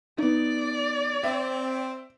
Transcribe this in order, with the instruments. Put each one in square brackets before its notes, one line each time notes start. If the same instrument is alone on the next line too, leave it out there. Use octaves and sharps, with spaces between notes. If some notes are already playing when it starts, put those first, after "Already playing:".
[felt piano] B3 D#4 [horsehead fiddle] D5
[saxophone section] C4 [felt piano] E5